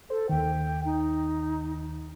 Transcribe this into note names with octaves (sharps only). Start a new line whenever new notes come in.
A4 C5
D#2 D#3 G5
D#4